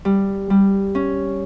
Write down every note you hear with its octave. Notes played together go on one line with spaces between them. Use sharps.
G3
G3
C#4